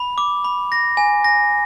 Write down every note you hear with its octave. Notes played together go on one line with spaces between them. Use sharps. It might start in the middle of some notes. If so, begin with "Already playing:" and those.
Already playing: B5
D6
B5
A#6
G#5
A#6